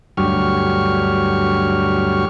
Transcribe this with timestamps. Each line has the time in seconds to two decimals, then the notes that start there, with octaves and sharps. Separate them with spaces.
0.17 D2 G2 F#3 G4 C#6 F6